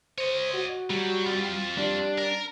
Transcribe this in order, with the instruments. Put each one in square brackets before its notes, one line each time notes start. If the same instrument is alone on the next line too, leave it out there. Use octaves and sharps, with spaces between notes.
[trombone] C5 [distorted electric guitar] C#5 D#5
[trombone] F#4
[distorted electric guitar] F#3 [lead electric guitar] G3
[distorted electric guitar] C4 F4
[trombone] G3 [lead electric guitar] D4
[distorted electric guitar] A#4